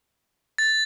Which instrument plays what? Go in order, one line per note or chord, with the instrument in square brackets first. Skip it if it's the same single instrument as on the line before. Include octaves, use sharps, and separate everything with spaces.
[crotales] A6